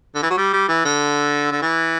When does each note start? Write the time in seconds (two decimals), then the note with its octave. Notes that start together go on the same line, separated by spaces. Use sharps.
0.15 D3
0.23 E3
0.30 F#3
0.37 G3
0.53 G3
0.68 E3
0.85 D3
1.51 D3
1.62 E3